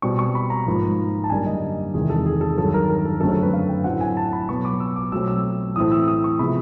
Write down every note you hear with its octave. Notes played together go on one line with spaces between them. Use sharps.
B2 G3 C4 C#6
C#6
B5
A#5
G#2 F3 A#3
A5
F#2 D3 G3 A#3 G#5
D#5
E2 C3 D#3 G#3 G#4
A4
G#4
A4
G2 D#3 F#3 A4
A#4
A#4
A4
F#2 D3 F#3 A3 C4 A4
A4
B4
F5
G5
A2 F#3 A3 C4 F#5
G#5
A5
B5
B2 F#3 B3 C#6
D6
E6
D6
B2 F#3 A3 C4 E6
E6
A2 E3 A3 C4 D#6
E6
D#6
C#6
C3 F3 G#3 B3 B5